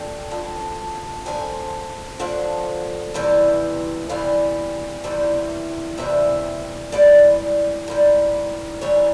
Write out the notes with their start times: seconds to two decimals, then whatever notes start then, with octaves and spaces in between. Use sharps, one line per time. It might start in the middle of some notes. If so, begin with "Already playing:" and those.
Already playing: F2 D3 G5
0.31 F2 D3 F3
1.26 F2 D3 F3 G#5
2.20 F2 D3 F3 F#5
3.14 E2 C3 E3 G3
4.09 E2 C3 E3 G3 F5
5.04 E2 C3 E3 G3
5.98 E2 C3 E3 G3 E5
6.92 G#2 E3 G3 D5
7.88 G#2 E3 G3
8.81 G#2 E3 G3 C#5